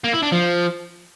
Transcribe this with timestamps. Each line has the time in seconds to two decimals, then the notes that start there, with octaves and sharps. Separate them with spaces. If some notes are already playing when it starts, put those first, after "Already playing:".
0.04 A#3
0.14 E4
0.23 D4
0.32 F3